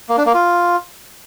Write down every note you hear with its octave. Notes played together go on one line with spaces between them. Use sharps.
A#3
D4
A#3
F4